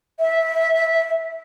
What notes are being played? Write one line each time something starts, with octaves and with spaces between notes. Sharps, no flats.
E5